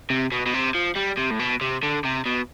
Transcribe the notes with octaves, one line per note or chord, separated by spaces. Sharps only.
C3
B2
B2
C3
F3
G3
C3
A2
B2
C3
D3
C3
B2